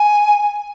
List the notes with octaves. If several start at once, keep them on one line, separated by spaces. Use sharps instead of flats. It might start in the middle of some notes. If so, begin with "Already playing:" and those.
Already playing: G#5